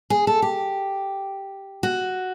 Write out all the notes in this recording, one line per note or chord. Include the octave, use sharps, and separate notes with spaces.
G#4
A4
G4
F#4